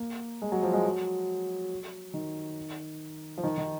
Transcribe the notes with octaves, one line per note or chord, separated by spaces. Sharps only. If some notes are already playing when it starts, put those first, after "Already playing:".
Already playing: A#3
G#3
F#3
F3
G#3
F#3
D#3
F3
D#3
D#3